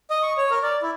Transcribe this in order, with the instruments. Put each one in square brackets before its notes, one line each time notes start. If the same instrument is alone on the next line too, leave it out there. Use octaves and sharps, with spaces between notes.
[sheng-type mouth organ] D#5
C#6
C#5
A#4
D5
E4